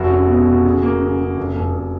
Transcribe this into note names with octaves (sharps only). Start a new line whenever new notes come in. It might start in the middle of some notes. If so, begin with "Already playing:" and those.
Already playing: F1 F#4
C#4
B2
F#4
C#3
A#3
C#3
C#3
F1
F1
F1